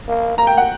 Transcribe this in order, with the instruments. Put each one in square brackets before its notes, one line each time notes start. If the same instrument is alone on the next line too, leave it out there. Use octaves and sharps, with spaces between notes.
[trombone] A#3
[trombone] A#3 [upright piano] A#5
[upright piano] G5
F#5